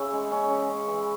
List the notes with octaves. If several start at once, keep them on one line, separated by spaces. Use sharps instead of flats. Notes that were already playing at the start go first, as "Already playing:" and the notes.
Already playing: C#3 C#4 E4
G#3
C#4
C#3
C#4
E3